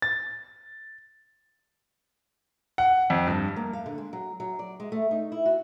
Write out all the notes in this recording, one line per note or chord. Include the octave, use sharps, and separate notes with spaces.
A6
F#5
F2
G2
A#3
F5
D3
G#3
F#3
F#3
D5
G#3
A3
D#4
E4
F#4